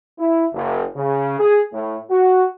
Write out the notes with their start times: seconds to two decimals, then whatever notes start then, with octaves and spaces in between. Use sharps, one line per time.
0.19 E4
0.53 F#1
0.96 C#3
1.39 G#4
1.73 A2
2.10 F#4